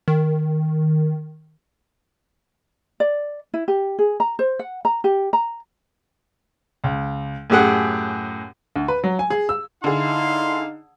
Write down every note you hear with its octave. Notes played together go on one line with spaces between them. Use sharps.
D#3
D5
E4
G4
G#4
A#5
C5
F#5
A#5
G4
A#5
C#2
F#2 A2 G4 G#4 F#5
D2
B4
F#3
G#5
G#4
E6
D3 D#4 E4 G#4 F5 C6